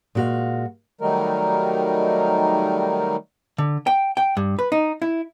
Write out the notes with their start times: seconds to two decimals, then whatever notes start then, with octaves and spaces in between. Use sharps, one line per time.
0.15 A#2 G#3 F#4 A4 F5
1.01 D#3 F#3 G3 A3 D#4 A#4
3.58 D3
3.87 G5
4.17 G5
4.37 G2
4.59 B4
4.72 D#4
5.02 E4